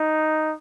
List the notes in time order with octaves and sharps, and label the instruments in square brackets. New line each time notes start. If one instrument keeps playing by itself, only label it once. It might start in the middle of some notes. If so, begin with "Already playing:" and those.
Already playing: [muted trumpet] D#4